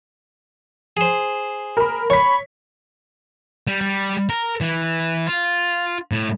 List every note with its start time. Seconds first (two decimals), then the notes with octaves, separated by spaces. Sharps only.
0.97 G#4 C5
1.77 A#4 B5
2.10 C#5 B5 C#6 B6
3.67 G3
3.81 G3
4.29 A#4
4.61 E3
5.27 F4
6.12 A2